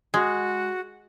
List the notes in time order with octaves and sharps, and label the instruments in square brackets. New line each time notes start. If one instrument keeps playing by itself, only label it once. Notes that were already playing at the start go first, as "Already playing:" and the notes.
[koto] G#3 [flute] F#4